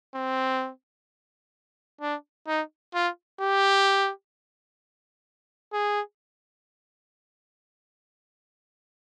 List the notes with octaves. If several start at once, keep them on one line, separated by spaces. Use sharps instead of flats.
C4
D4
D#4
F4
G4
G#4